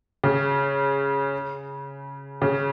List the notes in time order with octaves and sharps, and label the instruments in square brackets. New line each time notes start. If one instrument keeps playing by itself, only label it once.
[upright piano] C#3
C#3